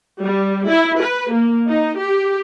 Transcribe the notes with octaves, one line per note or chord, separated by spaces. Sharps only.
G3
E4
B4
A#3
D#4
G4